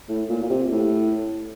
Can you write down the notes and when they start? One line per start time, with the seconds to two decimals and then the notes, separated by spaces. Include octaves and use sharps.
0.09 A2
0.29 A#2
0.42 A#2
0.50 C3
0.71 A2